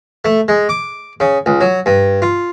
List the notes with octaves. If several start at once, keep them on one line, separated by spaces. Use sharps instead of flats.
A3
G#3
D6
C#3
C#2
F#3
G2
F4